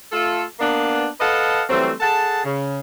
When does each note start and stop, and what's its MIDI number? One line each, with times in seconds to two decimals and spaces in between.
0.12 0.42 57
0.12 0.42 65
0.12 0.42 69
0.60 1.06 58
0.60 1.06 59
0.60 1.06 62
1.20 1.62 69
1.20 1.62 71
1.20 1.62 75
1.20 1.62 77
1.20 1.62 78
1.20 1.62 81
1.69 1.91 52
1.69 1.91 54
1.69 1.91 55
1.69 1.91 57
1.69 1.91 60
2.01 2.41 68
2.01 2.41 69
2.01 2.41 78
2.01 2.41 81
2.44 2.80 49